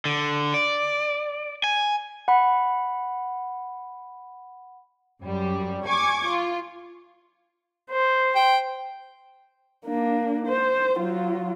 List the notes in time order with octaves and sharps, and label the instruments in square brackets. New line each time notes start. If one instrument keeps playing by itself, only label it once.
[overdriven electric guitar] D3
D5
G#5
[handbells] F#5 B5
[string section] F#2 G3
G#5 C#6 D6 G#6
F4
[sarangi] C5
[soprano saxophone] G5
[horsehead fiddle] A#3 D4
C5
F#3 F4